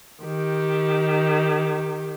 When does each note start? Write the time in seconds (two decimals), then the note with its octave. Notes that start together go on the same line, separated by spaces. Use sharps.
0.24 D#3 G4